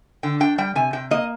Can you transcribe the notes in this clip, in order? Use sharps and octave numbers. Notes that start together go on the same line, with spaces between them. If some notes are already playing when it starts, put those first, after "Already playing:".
D3 G5
D4 G5
G3 G5
C3 G#5
C3 G5
A#3 D#5